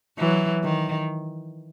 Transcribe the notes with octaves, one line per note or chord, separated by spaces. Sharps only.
E3 F#3
D#3